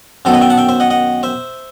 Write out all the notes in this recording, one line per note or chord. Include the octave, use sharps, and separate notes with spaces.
F#2 D#3 F#3 B3 A4 C5
B4 D#5
E5 G5
F#5 A5
E5 G5
C5 E5
D#5 F#5
D#5 F#5
C5 E5